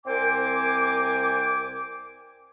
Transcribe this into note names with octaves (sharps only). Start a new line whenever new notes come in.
C2 C4 A#4 C5 G#5 D6